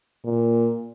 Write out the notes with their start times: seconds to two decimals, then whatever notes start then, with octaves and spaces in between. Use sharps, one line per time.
0.24 A#2